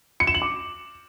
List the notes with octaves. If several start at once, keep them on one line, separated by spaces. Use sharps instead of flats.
C#7
E7
F#7
D6